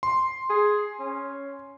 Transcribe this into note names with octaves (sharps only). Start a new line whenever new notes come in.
C6
G#4
C#4